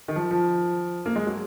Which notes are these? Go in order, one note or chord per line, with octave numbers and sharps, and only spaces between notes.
D#3
F3
F3
A#3
G#3
F#3